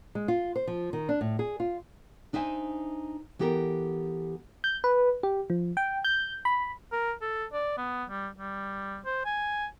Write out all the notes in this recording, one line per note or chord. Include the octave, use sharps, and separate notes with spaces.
G#3
F4
C5
F3
D#3
D4
A2
G#4
F4
D4 D#4 C5 E5 G#5
E3 B3 G4 A4 A#4
G6
B4
G4
F3
G5
G6
B5
A#4
A4
D5
B3
G3
G3
C5
G#5